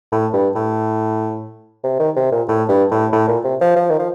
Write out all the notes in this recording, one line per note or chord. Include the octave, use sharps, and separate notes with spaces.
A2
G2
A2
C3
D#3
C3
A#2
A2
G2
A2
A2
A#2
C3
F3
F3
D#3
F3